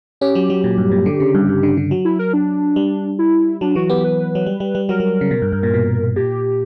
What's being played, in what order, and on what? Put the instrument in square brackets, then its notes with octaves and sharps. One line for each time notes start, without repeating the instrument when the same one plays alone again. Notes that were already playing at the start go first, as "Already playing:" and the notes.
[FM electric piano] C#4 [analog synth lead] G4
[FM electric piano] F#3
F#3
A#2
G2
A#2
D3
C#3
G2
G2
D3
D3
F#3
[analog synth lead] E4
A#4
D4
[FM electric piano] G3
[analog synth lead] E4
[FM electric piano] F#3 [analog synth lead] D4
[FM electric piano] E3 [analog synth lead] F#4
[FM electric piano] B3 [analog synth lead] G4
[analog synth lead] B4
[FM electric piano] F#3
G3
G3
G3
[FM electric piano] F#3 [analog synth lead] A#4
[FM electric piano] F#3
C#3
B2
G2
G2
A#2
B2
[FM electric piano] A#2 [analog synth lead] G4